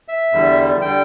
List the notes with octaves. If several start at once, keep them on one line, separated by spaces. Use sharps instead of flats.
E5
E2 D3 G3
D3 G3 G5